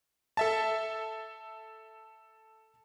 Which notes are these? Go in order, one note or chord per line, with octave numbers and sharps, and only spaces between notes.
A4 E5 A5